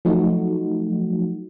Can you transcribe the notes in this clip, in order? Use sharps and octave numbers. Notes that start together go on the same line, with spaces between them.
F3 F#3 A3 D#4 F#4